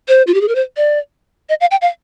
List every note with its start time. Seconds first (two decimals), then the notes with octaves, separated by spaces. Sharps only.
0.08 C5
0.27 F4
0.34 G4
0.41 G#4
0.48 A#4
0.55 C5
0.77 D5
1.49 D#5
1.61 F5
1.71 G5
1.81 F5